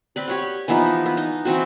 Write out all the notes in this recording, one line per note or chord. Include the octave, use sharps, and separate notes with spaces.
C4 B4 D5
G4 C#5 F#5
E3 F3 B3 D#4
B3
D#4
E3 C4 F#4